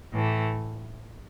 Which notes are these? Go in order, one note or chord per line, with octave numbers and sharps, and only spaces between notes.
A2 E3 A3